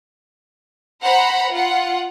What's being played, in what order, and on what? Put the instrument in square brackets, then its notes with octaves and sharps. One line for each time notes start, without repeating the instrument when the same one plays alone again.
[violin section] C5 F#5 A#5 B5
F4 F#5